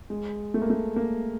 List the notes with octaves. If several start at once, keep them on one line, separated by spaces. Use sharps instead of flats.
G#3
A3
A#3
A3
A#3